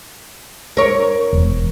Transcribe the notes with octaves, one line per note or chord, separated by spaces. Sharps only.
A#4 C#5
E1